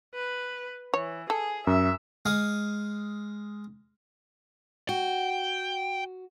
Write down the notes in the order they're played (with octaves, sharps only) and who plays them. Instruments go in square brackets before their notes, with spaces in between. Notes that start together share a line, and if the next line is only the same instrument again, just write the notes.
[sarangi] B4
[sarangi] E3 [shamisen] C#5
[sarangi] G#4 [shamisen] A4
[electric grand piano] F#2 [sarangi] E5
[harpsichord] G#3 F5 D#6
[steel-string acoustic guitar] F#4 [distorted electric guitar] G5